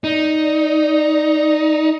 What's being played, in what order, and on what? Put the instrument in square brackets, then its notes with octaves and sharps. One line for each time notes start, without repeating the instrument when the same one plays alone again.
[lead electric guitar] D#4 [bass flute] D5